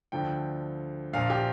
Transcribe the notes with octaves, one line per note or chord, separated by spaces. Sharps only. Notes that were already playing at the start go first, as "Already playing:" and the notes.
D2 D3 F3 G5
A#1 A#2 F3 F5
G4